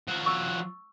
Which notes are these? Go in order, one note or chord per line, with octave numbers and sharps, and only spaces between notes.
F3 F#4
C#6 E6